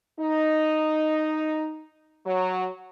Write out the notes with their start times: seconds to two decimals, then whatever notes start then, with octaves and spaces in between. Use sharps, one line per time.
0.19 D#4
2.25 F#3